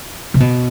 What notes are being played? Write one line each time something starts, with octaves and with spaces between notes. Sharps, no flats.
C3
B2